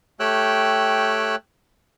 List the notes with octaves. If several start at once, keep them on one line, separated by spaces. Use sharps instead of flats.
A3 G4 C#5 G5 E6 F#6